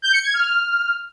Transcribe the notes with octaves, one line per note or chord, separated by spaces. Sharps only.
G6
C#7
G#6
F6